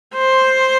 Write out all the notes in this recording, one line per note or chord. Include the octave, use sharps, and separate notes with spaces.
C5